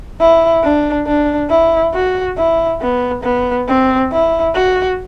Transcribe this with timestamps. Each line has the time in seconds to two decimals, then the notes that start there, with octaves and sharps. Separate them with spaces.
0.20 E4
0.63 D4
1.06 D4
1.49 E4
1.94 F#4
2.37 E4
2.81 B3
3.24 B3
3.68 C4
4.12 E4
4.54 F#4